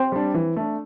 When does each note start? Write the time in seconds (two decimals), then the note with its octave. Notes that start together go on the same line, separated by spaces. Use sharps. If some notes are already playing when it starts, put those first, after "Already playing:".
Already playing: C4
0.12 G3 D4
0.34 E3
0.56 A3 D4